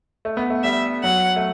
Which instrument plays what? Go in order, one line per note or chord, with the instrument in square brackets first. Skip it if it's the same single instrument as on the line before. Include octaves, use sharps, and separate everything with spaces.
[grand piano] A3
B3
A3
[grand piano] G3 [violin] E5
[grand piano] F#3 [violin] F#5
[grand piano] A3